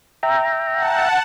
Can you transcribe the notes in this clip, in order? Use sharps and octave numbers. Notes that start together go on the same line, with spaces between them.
E5 G5 A#5
F#5 A5